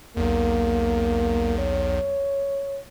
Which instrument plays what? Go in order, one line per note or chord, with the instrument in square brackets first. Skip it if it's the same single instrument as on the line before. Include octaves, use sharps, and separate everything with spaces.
[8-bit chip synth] B1 E2 [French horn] A#3
[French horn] C#5